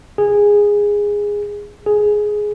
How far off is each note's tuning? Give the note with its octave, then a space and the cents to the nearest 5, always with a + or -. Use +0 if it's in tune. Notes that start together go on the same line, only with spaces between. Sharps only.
G#4 -15
G#4 +5